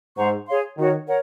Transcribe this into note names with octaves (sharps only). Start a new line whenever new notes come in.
G#2 C5 F#5 A#5 C#6
G#4 C#5 F5 C6
D#3 F#4 A#4 C#5
A#4 C#5 F#5